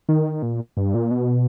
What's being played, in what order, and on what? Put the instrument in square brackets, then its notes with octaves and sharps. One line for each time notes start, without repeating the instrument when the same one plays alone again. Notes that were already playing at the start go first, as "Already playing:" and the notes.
[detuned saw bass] D#3
A#2
G2
A#2
B2